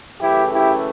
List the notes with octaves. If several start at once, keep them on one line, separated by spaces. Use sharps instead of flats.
F#2 C#3 E3 A3 E4 G4
E4 G4